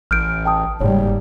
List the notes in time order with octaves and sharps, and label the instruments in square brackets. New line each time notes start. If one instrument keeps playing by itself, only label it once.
[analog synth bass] A1 [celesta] F6 G6 D7
[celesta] G5 A5 D#6
[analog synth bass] F#1 [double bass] G#2 G3 [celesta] C#5